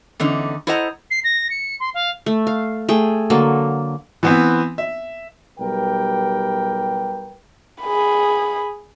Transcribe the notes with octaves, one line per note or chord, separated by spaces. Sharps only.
E2 D3 C#4 D#4
E4 A4 C5 D#5 F#5 A#5
C7
A#6
C#7
C6
F5
A3
F5
A3 G#4 G5
D3 F#3 A#3 A4
E3 B3 C4
E5
B1 G3 G4 A#4 B4 G5
G#4 B5